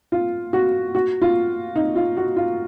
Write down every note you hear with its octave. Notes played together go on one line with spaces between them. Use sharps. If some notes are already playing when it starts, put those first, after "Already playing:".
F4
F#4
F#4
F4
D#4
F4
F#4
F4